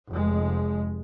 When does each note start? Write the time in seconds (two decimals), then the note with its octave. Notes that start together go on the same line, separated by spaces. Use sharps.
0.10 F1 G#3